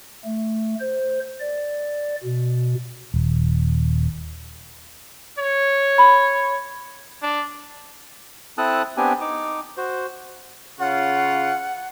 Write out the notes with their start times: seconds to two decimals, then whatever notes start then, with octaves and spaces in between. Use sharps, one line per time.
0.25 A3
0.80 C5
1.40 D5
2.24 B2
3.14 D#1
5.39 C#5
5.98 B5
7.22 D4
8.58 C4 E4 A4 A5 D#6 F#6
8.97 B3 C4 D4 G4 G#5
9.21 D#4 D6
9.77 F#4 C5
10.79 C#3 C#4 F4 F#5